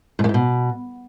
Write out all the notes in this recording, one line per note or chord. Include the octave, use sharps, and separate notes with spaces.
G#2
F#2
G#2
B2